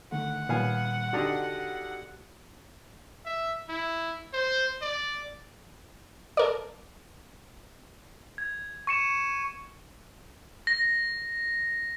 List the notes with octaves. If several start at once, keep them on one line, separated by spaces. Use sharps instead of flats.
D3 D#3 A3 F#5
A#2 D#3 G3 B3 F5 G#5
D3 D4 D#4 F#4 G4
E5
E4
C5
D5
A4 A#4 D5
G#6
C#6 C#7 E7
A#6